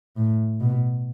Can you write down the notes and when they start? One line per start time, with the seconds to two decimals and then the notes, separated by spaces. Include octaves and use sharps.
0.17 A2
0.61 B2